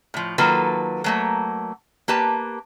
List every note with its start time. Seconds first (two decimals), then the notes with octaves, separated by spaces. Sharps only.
0.14 A2 F3
0.38 D#3 F#3 A#3 F4 A4 B4
1.04 F#3 A3 A#3
2.08 A#3 G4 B4 A5